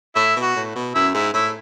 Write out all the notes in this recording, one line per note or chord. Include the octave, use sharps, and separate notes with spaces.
A2 E4
B2
F#4
A2
B2
F#2 E4
G#2 E4
A2 E4